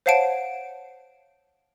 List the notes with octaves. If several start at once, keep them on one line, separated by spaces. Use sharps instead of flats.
C5 C#5 F5 F#5 A5 D7